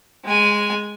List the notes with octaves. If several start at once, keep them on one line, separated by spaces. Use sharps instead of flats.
G#3 G#5